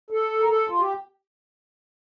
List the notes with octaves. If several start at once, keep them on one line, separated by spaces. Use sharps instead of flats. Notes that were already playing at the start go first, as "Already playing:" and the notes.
A4
A#4
A4
F4
G4